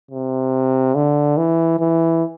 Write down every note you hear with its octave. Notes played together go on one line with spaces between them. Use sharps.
C3
D3
E3
E3